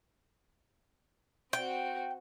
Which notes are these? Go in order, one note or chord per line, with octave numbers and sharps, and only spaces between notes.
C4 F#4 G5